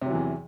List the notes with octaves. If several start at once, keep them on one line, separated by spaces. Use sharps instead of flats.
E2 C3 E3 F#3